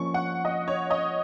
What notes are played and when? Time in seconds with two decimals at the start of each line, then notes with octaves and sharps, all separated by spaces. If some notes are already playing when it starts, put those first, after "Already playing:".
Already playing: F3 A#3 C#4 C#6
0.14 F#5
0.45 D#5
0.68 C#5
0.91 D#5